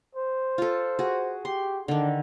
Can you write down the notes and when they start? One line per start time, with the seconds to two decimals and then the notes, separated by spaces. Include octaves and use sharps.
0.15 C5
0.58 F4 A4
0.99 F#4 G#4
1.45 G4 C6
1.88 D3 D#3 D4